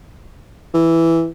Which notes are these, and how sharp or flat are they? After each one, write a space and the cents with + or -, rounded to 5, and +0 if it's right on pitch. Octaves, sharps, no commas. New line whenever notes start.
E3 +0